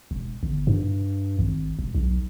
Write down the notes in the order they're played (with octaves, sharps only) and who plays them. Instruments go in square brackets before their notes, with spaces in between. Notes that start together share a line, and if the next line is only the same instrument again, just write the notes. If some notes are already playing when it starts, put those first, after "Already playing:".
[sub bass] E1
G1
G2
G#1
E1
B1